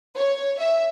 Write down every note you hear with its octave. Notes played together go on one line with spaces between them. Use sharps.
C#5
E5